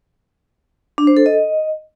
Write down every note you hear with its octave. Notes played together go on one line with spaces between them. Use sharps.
D4
C5
A4
D#5